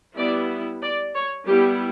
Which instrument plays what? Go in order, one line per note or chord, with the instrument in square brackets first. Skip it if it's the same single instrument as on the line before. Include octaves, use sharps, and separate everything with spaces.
[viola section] G3 B3 E4 D5
D5
C#5
G3 B3 E4 G4